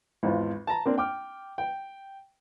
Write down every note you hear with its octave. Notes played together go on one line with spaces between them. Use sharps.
G#1 E2 F4
A5 A#5
A#3 C4 D4
G5 D6 F6
G5